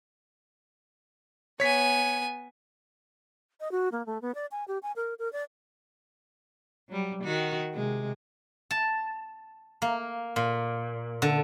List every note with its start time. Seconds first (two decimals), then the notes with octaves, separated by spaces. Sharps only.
1.60 B3 C#5 G#5 B6
3.60 D#5
3.72 F#4
3.92 A#3
4.06 A3
4.22 B3
4.35 D5
4.52 G#5
4.68 G4
4.83 G#5
4.96 A#4
5.19 A#4
5.33 D5
6.89 F#3 G3
7.23 D#3 F#4
7.74 C3 G#3
8.71 A5
9.82 A#3
10.36 A#2
11.22 D3